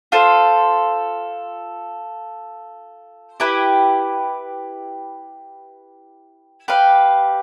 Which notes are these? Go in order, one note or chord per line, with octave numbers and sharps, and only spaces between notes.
F4 A4 C5
E4 G4 B4
G4 B4 F5